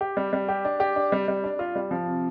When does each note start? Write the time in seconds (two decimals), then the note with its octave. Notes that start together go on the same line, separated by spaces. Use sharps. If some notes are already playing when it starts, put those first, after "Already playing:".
0.01 G4
0.17 G3
0.33 G3
0.48 G4
0.65 D4
0.80 G4
0.96 D4
1.12 G3
1.28 G3
1.44 D4
1.59 F4
1.76 G3
1.91 F3
2.07 C3